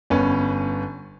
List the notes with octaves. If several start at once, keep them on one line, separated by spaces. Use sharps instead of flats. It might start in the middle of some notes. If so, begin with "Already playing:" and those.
G1 B3 C#4